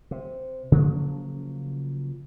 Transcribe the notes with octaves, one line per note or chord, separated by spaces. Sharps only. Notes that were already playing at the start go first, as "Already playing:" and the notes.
C3
C#3 F3 F#3 A#3